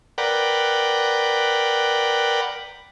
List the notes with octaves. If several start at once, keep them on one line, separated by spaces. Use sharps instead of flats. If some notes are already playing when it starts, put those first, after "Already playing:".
A#4 B4 D5 F#5 G5